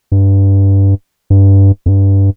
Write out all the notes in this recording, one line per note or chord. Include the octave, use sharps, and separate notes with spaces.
G2
G2
F2
G2